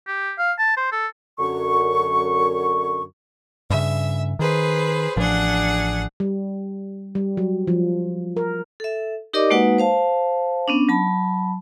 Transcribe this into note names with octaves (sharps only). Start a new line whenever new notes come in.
G4
F5
A5
C5
A4
F#2 D3 C#6
G2 C#3 E5
D#3 G#4 B4 C5
A1 F3 D4 G#4 F#5
G3
G3
F#3
F3
A#4
A4 E5
D#4 G4 A#4 D5 D#5 D6
G#3 A#3 D#4 F#4 B4 F#5
C5 F5 A5
B3 C#4 D4
F#3 A5 B5